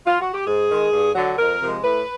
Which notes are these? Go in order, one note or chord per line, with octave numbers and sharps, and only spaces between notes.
F4
F#4
G4
G#2 G#4
D#3 G#3
G2
D3 F#3
F2 A#4
C3 F3 G#3
A2 B4